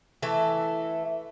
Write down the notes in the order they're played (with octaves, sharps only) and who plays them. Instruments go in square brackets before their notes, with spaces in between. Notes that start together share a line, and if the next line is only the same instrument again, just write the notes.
[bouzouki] E3 A3 A4